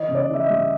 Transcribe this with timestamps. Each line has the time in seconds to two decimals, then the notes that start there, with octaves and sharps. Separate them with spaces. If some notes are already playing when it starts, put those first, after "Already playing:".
Already playing: E3 D#5
0.08 C#3
0.15 D5
0.29 E3 E5
0.43 D#5
0.49 G3